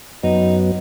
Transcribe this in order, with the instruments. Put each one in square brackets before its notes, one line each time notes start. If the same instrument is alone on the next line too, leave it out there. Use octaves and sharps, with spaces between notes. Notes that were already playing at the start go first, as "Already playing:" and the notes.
[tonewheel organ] F#2 F#3 B3 [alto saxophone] D#4